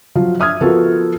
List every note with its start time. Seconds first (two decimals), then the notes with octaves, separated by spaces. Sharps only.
0.15 F3 F#3 F4
0.40 E5 D#6 F6 G#6
0.61 F3 B3 F4 F#4 A4 A#4